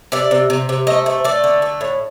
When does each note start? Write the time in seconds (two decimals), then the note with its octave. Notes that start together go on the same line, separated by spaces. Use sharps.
0.12 C3 D5
0.31 C3
0.50 C3
0.69 C3
0.87 A3 D#5
1.06 A3
1.24 A3 D5
1.44 D3
1.62 A3
1.81 A2